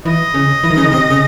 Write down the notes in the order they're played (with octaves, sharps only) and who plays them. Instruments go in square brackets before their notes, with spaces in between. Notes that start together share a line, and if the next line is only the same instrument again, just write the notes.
[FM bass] E3 [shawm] D#5
[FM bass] C#3
E3
D#3
C#3
D#3
C3
C#3